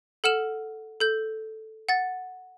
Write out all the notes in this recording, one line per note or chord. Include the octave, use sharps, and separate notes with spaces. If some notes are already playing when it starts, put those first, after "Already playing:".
A4 F#5 F6 E7 F#7
A4 G6
F#5 A6